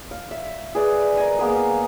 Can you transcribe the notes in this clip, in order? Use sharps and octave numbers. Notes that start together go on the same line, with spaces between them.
F5
E5
G#4 B4 D5
A#4 D#5 G#5
A#3 B3 G#4
F5